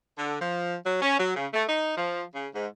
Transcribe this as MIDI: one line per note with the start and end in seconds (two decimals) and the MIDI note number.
0.18 0.36 50
0.40 0.75 53
0.85 1.01 54
1.02 1.18 61
1.19 1.33 54
1.35 1.46 49
1.53 1.62 57
1.68 1.94 63
1.97 2.23 53
2.34 2.47 49
2.54 2.66 44